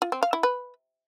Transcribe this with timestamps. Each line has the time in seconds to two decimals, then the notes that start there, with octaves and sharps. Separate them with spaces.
0.02 F4
0.12 C4
0.23 F5
0.33 E4
0.43 B4